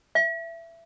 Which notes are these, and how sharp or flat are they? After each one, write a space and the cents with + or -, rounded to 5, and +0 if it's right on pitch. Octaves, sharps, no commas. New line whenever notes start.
E5 +20